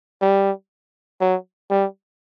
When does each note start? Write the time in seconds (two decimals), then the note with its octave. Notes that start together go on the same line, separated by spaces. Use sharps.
0.21 G3
1.21 F#3
1.70 G3